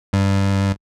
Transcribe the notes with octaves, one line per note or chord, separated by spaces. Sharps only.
G2